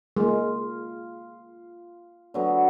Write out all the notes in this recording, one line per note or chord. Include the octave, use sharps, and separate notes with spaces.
G#3 A#3 F4
D3 F#3 B3